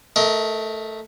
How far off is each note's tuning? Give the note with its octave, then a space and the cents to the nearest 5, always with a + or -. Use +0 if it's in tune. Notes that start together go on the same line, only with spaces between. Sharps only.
A3 +0 A#4 +0 D#5 +30